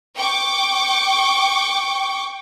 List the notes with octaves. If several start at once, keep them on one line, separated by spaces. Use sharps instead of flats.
G5 C#6 D6